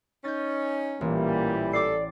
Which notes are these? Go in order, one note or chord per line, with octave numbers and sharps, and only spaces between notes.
C#4 D#4 G6 A6
A1 A#2 E3 G3 A#3
A4 D5 D6 A6 C7